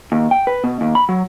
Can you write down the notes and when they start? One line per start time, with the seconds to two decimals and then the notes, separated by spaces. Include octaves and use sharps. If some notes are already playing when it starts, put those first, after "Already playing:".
0.12 D#2
0.31 G5
0.47 B4
0.64 B2
0.81 D#2
0.95 B5
1.09 F#3